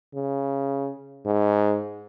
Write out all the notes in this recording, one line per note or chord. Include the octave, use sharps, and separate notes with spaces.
C#3
G#2